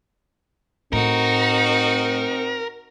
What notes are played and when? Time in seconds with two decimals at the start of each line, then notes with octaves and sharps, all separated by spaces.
0.93 A2 C4 D#4 F#4 A#4